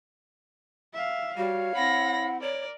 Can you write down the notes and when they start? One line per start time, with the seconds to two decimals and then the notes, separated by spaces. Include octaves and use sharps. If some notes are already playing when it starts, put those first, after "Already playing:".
0.94 E5 F5
1.37 G3 F#4 C#5 F5
1.75 C4 E4 F#5 B5 A#6
2.42 A#4 C#5 D5